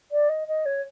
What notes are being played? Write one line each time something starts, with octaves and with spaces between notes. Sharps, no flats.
D5
D#5
D#5
C#5